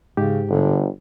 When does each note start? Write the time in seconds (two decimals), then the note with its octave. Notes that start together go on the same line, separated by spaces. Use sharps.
0.17 G#2 C#3 G4
0.50 G1 D3